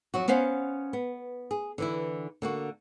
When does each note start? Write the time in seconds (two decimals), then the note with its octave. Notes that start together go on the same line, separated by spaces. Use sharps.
0.14 F2 F#3 F#4
0.28 B3 C#4 C5 F5 F#5
0.93 B3
1.51 G#4
1.78 D3 E3 E4
2.42 D3 A#3 F#4